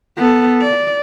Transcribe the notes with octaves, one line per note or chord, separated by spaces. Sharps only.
B3 A4
D5